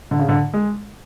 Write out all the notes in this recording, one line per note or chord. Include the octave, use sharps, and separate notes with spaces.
D3
C#3
D3
G#3